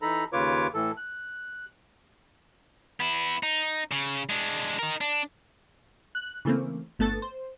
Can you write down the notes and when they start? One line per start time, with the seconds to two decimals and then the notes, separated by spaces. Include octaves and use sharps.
0.02 E3 D#4 A4 A#5 B5
0.33 D#2 C#3 F4 B4 C#5 D6
0.74 A2 E3 A4
0.97 F#6
3.00 B3 E4
3.43 D#4
3.91 C#3
4.30 G#3 D4
4.79 D#4 A#4
5.01 D4
6.15 F#6
6.45 C#3 E3 A3 A#3 C4
6.99 G1 A3 B3 A4 A6
7.22 C5